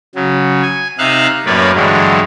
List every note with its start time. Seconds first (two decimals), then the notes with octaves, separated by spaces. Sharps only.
0.15 C#3 F#3
0.62 G#5
0.99 C3 D#4 E5 F5 F#6
1.46 F#2 A2 A#3 B4 C#5 D5
1.75 G2 D3 E3 F#3 G#3